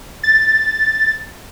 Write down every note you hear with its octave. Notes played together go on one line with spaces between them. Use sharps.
A6